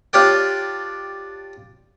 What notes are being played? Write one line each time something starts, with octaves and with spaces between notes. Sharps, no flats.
D4 F4 G4 C#5 D5 G5